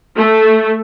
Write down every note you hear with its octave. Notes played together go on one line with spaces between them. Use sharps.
A3